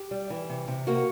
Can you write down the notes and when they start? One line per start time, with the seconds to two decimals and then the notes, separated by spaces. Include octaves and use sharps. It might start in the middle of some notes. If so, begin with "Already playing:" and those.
Already playing: G4
0.11 G3
0.30 E3
0.49 C3
0.68 C3
0.87 A#3 F#4